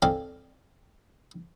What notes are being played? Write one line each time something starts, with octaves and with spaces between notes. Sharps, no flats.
C4 D#4 A4 D5 F5 G#5